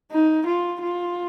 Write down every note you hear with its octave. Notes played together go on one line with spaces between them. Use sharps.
D#4
F4
F4